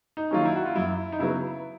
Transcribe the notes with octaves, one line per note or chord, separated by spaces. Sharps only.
D#4
D#3 F#3 A#3 C#4 F4
E4
F#4
F4
F#2 E4
D#4
C#3 F#3 B3 E4